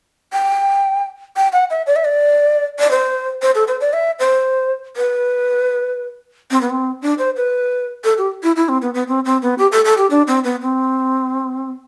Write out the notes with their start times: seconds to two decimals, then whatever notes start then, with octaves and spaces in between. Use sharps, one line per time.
0.33 G5
1.36 G5
1.53 F#5
1.70 E5
1.87 D5
1.96 E5
2.05 D5
2.79 D5
2.91 C5
3.42 C5
3.55 A4
3.68 C5
3.81 D5
3.93 E5
4.19 C5
4.97 B4
6.51 C4
6.61 B3
6.70 C4
7.02 D4
7.18 C5
7.37 B4
8.04 A4
8.18 G4
8.43 E4
8.56 E4
8.69 C4
8.82 B3
8.94 B3
9.08 C4
9.25 C4
9.42 B3
9.58 G4
9.72 A4
9.85 A4
9.98 G4
10.10 D4
10.27 C4
10.44 B3
10.62 C4